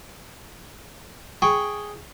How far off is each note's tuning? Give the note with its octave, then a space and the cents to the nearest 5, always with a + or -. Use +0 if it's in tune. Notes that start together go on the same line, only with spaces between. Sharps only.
G#4 +0 G5 +0 C#6 +0